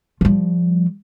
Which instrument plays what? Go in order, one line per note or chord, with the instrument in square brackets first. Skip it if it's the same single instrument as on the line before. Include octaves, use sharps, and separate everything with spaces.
[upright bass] F3 G3